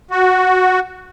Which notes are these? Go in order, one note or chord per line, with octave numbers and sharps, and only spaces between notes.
F#4